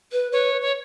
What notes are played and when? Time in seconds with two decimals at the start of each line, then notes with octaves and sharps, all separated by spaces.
0.12 B4
0.32 B4 C#5
0.61 C#5